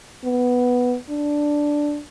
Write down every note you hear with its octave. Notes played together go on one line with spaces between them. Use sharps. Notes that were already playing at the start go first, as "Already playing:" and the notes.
B3
D4